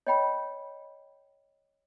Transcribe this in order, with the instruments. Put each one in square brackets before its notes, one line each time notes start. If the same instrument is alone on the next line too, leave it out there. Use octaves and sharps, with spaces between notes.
[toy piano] C#5 D#5 G5 B5